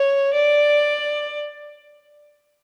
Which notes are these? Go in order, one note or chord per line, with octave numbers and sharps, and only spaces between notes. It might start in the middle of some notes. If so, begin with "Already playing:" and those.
Already playing: C#5
D5